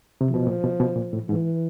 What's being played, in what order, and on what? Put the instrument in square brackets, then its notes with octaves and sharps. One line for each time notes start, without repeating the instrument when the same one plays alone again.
[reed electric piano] C3
[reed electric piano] B2 [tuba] F3
[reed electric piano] A#2
B2
B2
A#2
A2
[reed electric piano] G#2 [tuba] E3